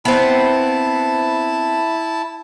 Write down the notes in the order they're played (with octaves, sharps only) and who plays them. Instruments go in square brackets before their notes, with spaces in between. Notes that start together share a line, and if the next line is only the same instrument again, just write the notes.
[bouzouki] B3 C4 [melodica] E4 A5